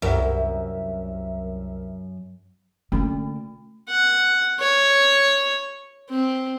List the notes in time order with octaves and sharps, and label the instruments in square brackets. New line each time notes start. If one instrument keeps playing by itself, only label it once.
[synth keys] C2 A#4 E5 [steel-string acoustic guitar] F#2
[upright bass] D3 A#3 [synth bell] A3 C#4
[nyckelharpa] F#5
C#5
C4